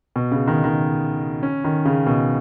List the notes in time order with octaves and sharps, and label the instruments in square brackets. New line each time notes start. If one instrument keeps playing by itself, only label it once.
[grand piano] B2
C#3
D#3
D#3
C#4
D#3
C#3
B2